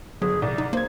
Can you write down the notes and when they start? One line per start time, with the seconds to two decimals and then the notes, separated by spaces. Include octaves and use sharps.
0.22 G1 F#3 G#4
0.42 C2 D5
0.58 D#4
0.73 A#3 C5 G#6